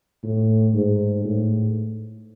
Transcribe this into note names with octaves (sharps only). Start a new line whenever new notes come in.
A2
G#2
A2